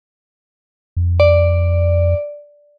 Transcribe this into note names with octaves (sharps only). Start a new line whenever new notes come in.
F2
D5